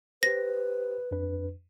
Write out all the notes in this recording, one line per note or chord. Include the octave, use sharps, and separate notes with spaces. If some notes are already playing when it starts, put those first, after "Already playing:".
G4 B4 C5 A#6
F2 D4 B4